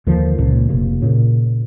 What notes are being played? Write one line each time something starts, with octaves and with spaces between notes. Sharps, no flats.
D#2 D3 D#3 F3
C#2 A#2
F1 C3 A#3
A#2 C#3